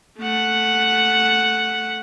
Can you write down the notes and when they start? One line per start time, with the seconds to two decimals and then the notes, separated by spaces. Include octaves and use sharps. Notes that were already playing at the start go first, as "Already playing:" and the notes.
0.19 A3 F#5